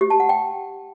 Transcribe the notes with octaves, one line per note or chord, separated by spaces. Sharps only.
G4
A5
F#5
G5